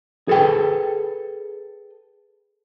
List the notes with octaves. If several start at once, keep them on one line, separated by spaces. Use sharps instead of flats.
G#4 A4 B4 G5